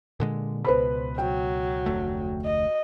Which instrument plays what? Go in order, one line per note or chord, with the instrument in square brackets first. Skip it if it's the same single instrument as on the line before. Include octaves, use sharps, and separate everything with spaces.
[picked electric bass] A#2 D3 G#3
[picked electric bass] C#2 B2 [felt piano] B4 C5 B5
[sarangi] F#3 [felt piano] G5
[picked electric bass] F1 D2 A3
[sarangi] D#5